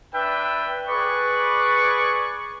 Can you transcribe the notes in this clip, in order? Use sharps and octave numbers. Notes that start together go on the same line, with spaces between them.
D4 B4 E5 G5
G#4 B4 D5 C#6